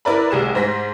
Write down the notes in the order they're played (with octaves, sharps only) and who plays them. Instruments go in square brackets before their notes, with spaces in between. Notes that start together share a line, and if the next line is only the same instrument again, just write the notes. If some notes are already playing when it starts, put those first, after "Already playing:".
[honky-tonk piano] E4 A#4 B4 D5 A#5 B5
F1 C2 G#4 E7
G#2 C5 A#6 B6